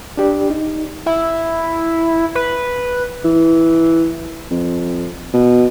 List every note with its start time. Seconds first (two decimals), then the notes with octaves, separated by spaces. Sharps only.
0.17 D4 G4 D5
0.50 D#4
1.06 E4
2.35 B4
3.25 E3
4.51 F2
5.33 B2